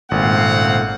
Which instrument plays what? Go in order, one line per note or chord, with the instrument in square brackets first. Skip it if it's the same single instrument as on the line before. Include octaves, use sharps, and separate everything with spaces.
[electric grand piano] G#1 [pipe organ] A#2 C#3 A3 [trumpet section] C4 F5 F#5